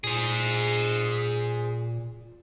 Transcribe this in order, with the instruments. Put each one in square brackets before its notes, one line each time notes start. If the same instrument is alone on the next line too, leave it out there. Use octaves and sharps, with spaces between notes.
[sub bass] A#2 [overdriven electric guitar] G#4 C5